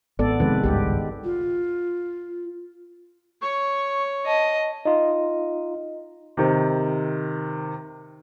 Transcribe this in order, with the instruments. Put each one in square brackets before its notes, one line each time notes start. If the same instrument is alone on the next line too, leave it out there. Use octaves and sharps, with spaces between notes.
[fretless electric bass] G#1 [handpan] B3 A4 D5
[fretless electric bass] F2 C3 [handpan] D#3 G#3 B4
[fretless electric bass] G#1 C#2 G2 [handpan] G4
[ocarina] F4
[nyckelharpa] C#5 [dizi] C#6
[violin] D#5 [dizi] A5
[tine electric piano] D#4 F4 [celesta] D#5
[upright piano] C3 D#3